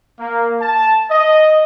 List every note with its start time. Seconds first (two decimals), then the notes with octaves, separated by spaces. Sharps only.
0.19 A#3
0.61 A5
1.11 D#5